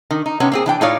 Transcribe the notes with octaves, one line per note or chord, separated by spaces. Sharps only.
D#3
D#4
C3 B3 C#4
A#3 C4 G#4
E3 D4 G5
A2 D#4 F4 C#5 D5 F5